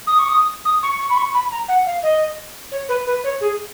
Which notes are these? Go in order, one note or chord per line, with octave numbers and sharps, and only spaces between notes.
D#6
C#6
D#6
D#6
C#6
C#6
B5
C#6
B5
A#5
F#5
F5
D#5
C#5
B4
B4
C#5
G#4